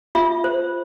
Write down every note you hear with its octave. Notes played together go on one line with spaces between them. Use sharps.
F4 E5
C5